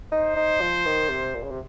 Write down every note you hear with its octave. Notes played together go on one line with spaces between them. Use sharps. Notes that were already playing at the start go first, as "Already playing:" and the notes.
D#4 C5
D#4
F3
D#3
C3
A#2
C#3
C3